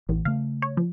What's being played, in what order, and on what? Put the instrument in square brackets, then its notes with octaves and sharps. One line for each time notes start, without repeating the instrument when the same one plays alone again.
[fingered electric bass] A1 [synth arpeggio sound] E2
[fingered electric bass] C#3 A3 [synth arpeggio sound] F5
[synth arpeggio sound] C#5
F3